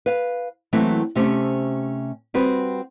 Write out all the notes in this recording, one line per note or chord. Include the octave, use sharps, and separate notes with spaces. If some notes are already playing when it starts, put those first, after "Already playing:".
B4 F5
E3 F#3 A3 A#3 C4 E4
C3 A3 C4 C#4 G4
G3 C4 F#4 B4